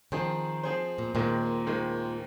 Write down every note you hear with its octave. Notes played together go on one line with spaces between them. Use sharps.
D#3 F3 C4 G#4 C5
F3 C4 G#4 C5
A#2
D#2 A#2 D#3 G#3 C4
D#2 D#3 G#3 C4